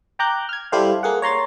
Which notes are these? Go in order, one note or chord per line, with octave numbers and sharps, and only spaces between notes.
G5 A#5 D6 F#6 G6
F6 G#6
G3 E4 G4 A4 C5 F5
A#3 G#4 F#5
C#5 A#5 C6 A6